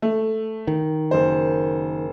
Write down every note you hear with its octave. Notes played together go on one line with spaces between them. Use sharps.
A3
D#3
F#1 C5